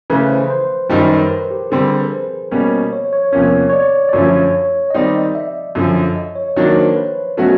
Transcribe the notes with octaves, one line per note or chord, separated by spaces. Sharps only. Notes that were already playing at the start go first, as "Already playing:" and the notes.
C#3 E3 A3 B4
B4
C5
C5
F#2 D#3 G3 C5
B4
A#4
G4
D3 G3 C4 G#4
G#4
A#4
B4
C5
B2 G3 A#3 C#4
C#5
C#5
E2 C3 F3 A#3 C#4 C#5
C#5
D5
D5
F#2 D3 F3 A3 C#4 C#5
D#5
D#3 G3 C4 D#4 D5
D#5
E5
F#2 D3 F3
D#5
C#5
D#3 F#3 A#3 D4 C#5
C5
B4
B2 F#3 A3 C#4 F#4